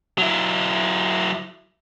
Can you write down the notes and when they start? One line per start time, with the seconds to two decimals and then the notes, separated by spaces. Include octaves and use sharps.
0.18 F#3 E4